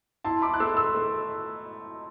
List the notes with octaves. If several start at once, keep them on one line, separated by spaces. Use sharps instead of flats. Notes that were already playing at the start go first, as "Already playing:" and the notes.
E4 A5 C6
B5 D6
F#6
A3 C6 E6
C6 E6
A3